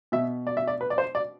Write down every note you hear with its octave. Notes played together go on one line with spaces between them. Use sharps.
B2 E5
D5
E5
D5
B4
D5
C5
D5